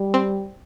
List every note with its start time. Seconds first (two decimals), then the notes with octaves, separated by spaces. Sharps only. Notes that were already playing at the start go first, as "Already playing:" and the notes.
Already playing: G3
0.14 C4